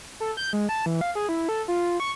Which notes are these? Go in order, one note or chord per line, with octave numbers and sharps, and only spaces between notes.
A4
G6
G#3
A5
E3
F5
G#4
E4
A4
F4
C#6